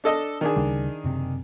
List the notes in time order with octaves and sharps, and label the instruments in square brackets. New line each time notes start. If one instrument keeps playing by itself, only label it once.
[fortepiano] D4 A4 D#5
D#3 D4 G#4
[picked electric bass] D2 C#3 G3
F#1 C3